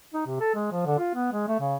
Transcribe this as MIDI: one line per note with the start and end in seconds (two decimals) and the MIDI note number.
0.14 0.23 63
0.26 0.40 48
0.40 0.54 69
0.55 0.71 56
0.72 0.84 53
0.86 0.98 50
0.99 1.11 65
1.15 1.32 59
1.33 1.45 56
1.48 1.57 57
1.60 1.76 49